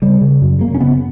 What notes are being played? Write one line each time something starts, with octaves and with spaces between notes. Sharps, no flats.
C#3 G3
C#3
F#2
C#3 A#3
C#4
C#3 B3